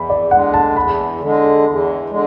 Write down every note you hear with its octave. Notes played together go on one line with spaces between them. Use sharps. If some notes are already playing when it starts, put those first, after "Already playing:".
Already playing: E2 B5
D5
D3 G#3 F#5
A5
E2 B5
D3 G#3
E2
D3 G#3